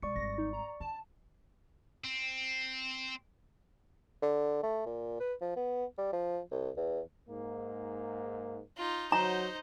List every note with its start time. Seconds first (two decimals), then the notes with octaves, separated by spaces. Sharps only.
0.03 B2 G#3 D5 C#6 C#7
0.16 G#1 G3 A#6
0.38 D#4
0.53 A#5
0.80 D3 A5
2.04 C4
4.22 D3
4.63 A3
4.86 A#2
5.20 B4
5.41 F3
5.57 B3
5.98 G3
6.13 F3
6.52 C2
6.77 E2
7.28 G#2 A#3
8.77 D#4 F4
9.12 F#3 D#4 C5 A#5